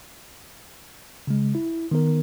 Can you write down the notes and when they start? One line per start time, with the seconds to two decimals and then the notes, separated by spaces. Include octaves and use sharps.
1.27 C#3 G#3
1.55 E4
1.91 D#3 B3 A#4